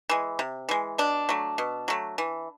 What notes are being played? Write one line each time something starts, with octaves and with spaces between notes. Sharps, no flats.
E3 G#3
C3
E3 G#3
B2 D4
F#3 A3
B2
F#3 A3
E3